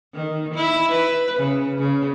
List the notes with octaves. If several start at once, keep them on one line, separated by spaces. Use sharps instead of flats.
D#3
E4
B4
C#3
C#3